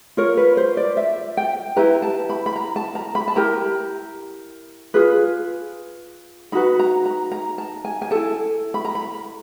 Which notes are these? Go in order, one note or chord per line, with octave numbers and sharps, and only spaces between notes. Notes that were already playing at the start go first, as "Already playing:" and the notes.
F4 A#4 C#5
B4
C5
D5
E5
G5
E4 G4 B4 A#5
A5
B5
B5
A#5
A5
A#5
B5
A5
E4 G4 A#4 A#5
F4 G#4 B4
D#4 F#4 B4 B5
A#5
A#5
A#5
A5
G#5
G#5
E4 A4 A5
B5
A#5
B5